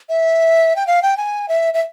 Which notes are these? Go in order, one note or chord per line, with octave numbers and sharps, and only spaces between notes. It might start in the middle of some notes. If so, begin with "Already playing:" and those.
E5
G5
F5
G5
G#5
E5
E5